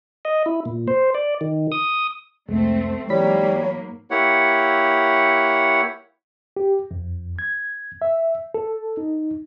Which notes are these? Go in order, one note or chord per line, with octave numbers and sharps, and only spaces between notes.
D#5
E4
A#2
C5
D5
D#3
D#6
C2 F2 G#3 A3 C4
G#2 E3 F#3 G3 A#3 C#5 B5 B6
A#3 E4 G4 C#5 F#5
G4
F2
G#6
E5
A4
D#4